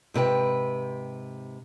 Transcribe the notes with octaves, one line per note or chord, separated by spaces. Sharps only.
G#2 C3 B4 G5